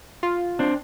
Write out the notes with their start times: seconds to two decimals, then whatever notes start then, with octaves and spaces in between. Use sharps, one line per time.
0.23 F4
0.59 C4 D4